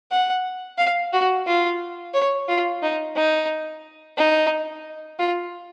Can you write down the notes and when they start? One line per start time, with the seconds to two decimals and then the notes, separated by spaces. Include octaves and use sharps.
0.11 F#5
0.78 F5
1.13 F#4
1.47 F4
2.14 C#5
2.49 F4
2.82 D#4
3.16 D#4
4.17 D#4
5.19 F4